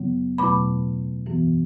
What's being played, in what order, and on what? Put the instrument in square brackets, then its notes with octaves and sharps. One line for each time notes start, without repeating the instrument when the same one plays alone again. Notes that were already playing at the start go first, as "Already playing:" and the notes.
Already playing: [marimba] F#2 C#3 F#3 B3
E2 B2 F#3 A3 B5 D6
F#2 E3 B3